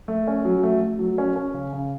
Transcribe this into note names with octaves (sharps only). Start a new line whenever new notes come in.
A3
C#4
F#3
A3
A3
F#3
C#4
C#4
C#3
C#3